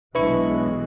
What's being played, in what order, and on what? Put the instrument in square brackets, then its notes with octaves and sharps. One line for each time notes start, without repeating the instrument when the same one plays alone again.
[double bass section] B1 E3 G#3 [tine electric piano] D4 E4 C#6 [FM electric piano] B4